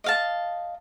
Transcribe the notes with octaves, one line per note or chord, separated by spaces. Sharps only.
D#5 F5 A5